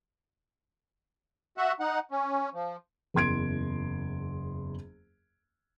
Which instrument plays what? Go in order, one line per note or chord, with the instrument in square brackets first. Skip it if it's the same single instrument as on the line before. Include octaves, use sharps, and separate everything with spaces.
[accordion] F#4 E5 F#5
D#4 F#5
C#4
F3
[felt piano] F#1 E2 C6 G#6 D7